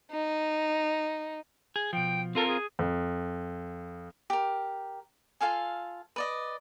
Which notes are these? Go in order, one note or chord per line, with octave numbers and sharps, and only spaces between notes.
D#4
G#4
B2 F3 G5
C4 F4 A4 A#4
G#4
F2
G4 A#4
F4 A4 F5 G#5
B4 D5 D#5